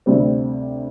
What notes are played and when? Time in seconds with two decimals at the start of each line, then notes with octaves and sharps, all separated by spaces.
0.06 D2 C3 G3 C4